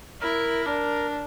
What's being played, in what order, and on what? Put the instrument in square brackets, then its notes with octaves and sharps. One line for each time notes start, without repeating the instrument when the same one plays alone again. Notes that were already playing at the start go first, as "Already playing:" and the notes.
[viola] E4 [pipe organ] A#4
[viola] D4 [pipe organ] A#4